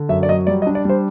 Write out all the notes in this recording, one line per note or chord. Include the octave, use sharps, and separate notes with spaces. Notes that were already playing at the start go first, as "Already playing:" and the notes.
Already playing: D3
F#2 E5
D5
F#3 D#5
G3 D5
D#5
D4
D5
G3 C5